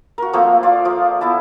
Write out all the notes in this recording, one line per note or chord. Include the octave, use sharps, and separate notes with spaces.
F#4 A#4
F3 A3 A#3 C4
F4 D5
F3
B3 E4 A5